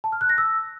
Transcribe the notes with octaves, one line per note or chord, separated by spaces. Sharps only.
A5
F6
F#6
A#6
E6